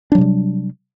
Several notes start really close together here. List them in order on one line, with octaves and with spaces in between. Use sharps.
D4 F#3 C3 G3